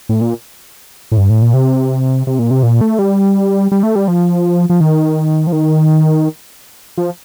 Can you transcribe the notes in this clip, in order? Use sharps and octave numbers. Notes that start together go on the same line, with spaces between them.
A2
A#2
A2
G2
A2
A#2
C3
C3
A#2
C3
A#2
A3
G3
G3
A3
G3
F3
F3
D#3
F3
D#3
F3